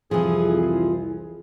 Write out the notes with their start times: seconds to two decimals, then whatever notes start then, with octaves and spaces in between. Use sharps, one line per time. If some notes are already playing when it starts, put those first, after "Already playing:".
0.11 C2 F2 E3 F3 G#4
0.62 G#4